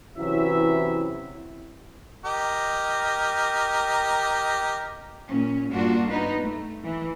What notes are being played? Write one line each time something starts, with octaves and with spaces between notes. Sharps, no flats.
C3 E3 F#3 C#4 E4 E5
G4 A#4 D#5
A#2 C#4
G2 A#3 D4 F4 F#4
B3 D#4 B4
A3
E3